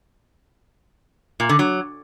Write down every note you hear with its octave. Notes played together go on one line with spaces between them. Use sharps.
A#2
D3
F#3